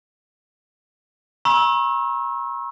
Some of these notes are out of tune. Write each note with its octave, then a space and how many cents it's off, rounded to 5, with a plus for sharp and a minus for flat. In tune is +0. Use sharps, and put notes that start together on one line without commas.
A#5 +45 C#6 -40 E6 -15